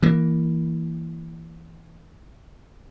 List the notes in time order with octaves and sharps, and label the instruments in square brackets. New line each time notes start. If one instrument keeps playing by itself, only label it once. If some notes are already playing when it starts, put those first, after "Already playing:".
[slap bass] E3 A#3